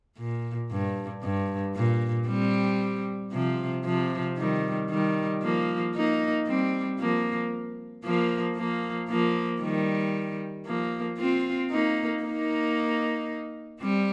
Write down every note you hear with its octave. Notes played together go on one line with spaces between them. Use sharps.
A#2
G2
G2
A#2
G3 C4
C3 F3
C3 F3
D#3 G3
D#3 G3
F3 A#3
A#3 D#4
G3 C4
F3 A#3
F3 A#3
F3 A#3
F3 A#3
D#3 G3
F3 A#3
C4 F4
A#3 D#4
A#3 D#4
G3 C4